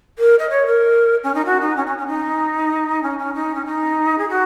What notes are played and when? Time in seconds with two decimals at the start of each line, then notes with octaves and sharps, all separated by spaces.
0.18 A#4
0.39 D#5
0.50 C#5
0.66 A#4
1.23 C#4
1.34 D#4
1.45 F#4
1.61 D#4
1.76 C#4
1.86 C#4
1.98 C#4
2.07 D#4
3.03 C#4
3.18 C#4
3.34 D#4
3.55 C#4
3.66 D#4
4.18 G#4
4.29 F#4